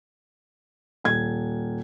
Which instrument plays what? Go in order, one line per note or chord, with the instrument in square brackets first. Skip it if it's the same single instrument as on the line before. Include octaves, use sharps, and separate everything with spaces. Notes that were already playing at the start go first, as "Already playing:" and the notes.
[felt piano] D#1 G#6